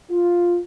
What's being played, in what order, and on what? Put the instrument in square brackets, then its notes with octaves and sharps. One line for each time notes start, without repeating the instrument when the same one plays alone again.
[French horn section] F4